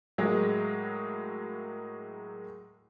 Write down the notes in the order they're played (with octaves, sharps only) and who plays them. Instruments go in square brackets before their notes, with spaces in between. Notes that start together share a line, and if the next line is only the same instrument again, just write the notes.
[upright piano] A2 F#3 G#3 A#3